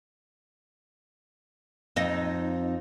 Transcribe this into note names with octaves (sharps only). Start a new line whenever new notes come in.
F2 D#4